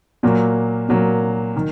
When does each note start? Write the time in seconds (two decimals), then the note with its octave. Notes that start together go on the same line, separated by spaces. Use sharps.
0.23 A#2 F#3 A#3
0.89 A#2 F#3 A#3
1.56 D#3